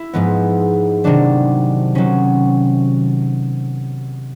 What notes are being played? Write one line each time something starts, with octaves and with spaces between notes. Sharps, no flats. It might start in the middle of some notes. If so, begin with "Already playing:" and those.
Already playing: E4
G#2 F3 G#3 B3
C3 D#3 F#3 D4
C3 D#3 F#3 C#4